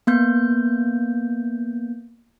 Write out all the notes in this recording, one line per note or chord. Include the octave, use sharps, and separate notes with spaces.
A#3 B3 G6